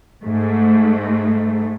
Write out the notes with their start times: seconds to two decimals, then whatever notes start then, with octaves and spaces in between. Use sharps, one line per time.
0.24 G#2 A3